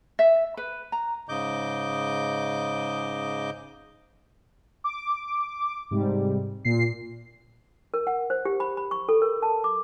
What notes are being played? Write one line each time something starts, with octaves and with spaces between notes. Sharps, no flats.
E5
B4
A#5
G#2 C#3 D#5 D6 G6
D6
G#2 C3 G3
A#2 C7
A#4
F#5
C5
G4
B5
B5
C#6
A4
A#4
A5
D6